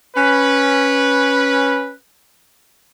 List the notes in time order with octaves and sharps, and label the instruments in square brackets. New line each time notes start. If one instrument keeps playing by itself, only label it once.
[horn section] C#4 B4